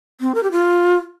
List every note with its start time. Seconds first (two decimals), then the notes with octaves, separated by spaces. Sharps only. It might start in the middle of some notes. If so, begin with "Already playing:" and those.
0.21 C4
0.35 A#4
0.43 G4
0.52 F4